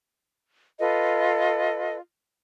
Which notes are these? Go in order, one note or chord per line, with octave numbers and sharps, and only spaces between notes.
F4 A4 B4 D#5